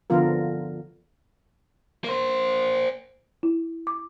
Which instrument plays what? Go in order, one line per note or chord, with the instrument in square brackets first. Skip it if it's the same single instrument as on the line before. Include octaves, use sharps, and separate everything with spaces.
[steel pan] D3 F3 B3 F4 A#4
[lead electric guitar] A#3 C5
[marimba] E4
D6